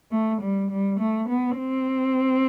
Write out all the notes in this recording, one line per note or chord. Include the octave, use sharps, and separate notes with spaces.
A3
G3
G3
A3
B3
C4